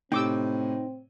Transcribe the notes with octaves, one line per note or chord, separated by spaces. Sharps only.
A2 C3 C4 D#4 G5 D6 E6